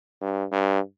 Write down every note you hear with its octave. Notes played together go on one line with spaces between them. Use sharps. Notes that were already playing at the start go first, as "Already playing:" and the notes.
G2
G2